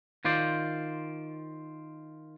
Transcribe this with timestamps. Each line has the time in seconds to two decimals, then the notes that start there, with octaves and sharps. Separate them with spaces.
0.25 D#3 F4 C5 D5